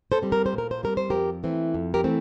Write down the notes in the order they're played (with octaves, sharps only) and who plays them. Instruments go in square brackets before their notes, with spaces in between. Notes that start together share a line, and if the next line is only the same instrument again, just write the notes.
[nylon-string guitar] A4 C5
G3 C4
A#4
C5
A#2
A#4
C5
G3 C4 A#4
C5
F2 G4 A#4
E3 A3 C4
F2
G4 A#4
E3 A3 C4